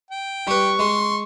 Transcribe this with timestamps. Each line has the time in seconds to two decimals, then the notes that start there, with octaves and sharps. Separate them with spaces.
0.11 G5
0.48 G3 B4 C#6
0.79 G#3 C6